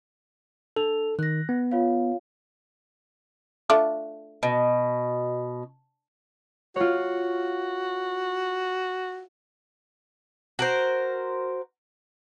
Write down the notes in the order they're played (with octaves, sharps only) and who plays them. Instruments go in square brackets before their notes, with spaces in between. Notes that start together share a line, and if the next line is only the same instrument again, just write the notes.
[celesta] D4 F7 [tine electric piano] A4
[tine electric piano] D#3 [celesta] F#6 A#6
[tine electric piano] B3
[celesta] F4 C#5 F5
[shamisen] A3 D4 F4
[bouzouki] B2
[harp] F4 C#5 [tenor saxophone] F#4
[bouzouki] F#4 A#4 C5